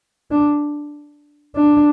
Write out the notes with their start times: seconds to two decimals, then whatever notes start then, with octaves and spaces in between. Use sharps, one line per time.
0.31 D4
1.56 D4